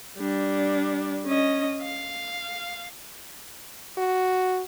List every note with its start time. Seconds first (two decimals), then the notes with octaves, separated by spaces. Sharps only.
0.18 G3 D4
1.25 C#4 D#5
1.83 F5
3.98 F#4